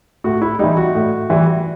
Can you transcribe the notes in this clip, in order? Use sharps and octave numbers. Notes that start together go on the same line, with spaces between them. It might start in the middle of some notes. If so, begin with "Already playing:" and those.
A2 F#4
E4
E3 G3 D#4
F#4
A2
E3 G3